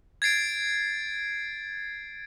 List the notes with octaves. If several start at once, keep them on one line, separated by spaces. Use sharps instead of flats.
G#6 A6 C7 D7